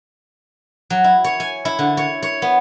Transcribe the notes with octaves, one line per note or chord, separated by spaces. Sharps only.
F#3
E4
C#5
G#5
E4
D3
C#5
C#5
B3